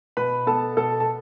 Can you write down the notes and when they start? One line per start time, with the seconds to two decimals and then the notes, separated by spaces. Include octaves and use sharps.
0.17 B2 B4 B5
0.47 B3 A4 A5
0.77 B2 A4 A5
1.00 A5